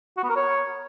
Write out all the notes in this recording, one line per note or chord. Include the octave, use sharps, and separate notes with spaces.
F#4
B3
A#4
C#5